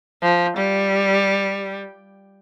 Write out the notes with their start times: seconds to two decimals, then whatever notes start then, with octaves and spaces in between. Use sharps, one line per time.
0.23 F3
0.57 G3